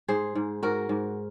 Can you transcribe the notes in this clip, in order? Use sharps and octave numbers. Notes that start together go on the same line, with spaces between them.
G#2 G#4 C5
G#2
G#2 F#4 A#4
G#2